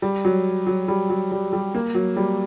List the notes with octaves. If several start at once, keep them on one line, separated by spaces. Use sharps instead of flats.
G3
F#3
F#3
G3
F#3
G3
G3
A#3
F#3
G3